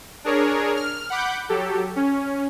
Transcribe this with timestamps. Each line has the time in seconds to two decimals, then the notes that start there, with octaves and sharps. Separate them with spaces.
0.24 D4 G#4 A#4 C#5
0.76 F6
1.10 F#5 B5 D6 G6
1.49 F#3 G4 A4
1.96 C#4